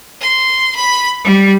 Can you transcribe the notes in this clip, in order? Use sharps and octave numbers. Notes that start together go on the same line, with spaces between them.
C6
B5
G3